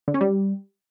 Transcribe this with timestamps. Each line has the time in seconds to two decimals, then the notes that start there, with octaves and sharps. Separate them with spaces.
0.08 D3
0.14 C#4
0.21 G3